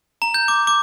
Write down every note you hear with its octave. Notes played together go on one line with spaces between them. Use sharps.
A#5
G6
D6
D6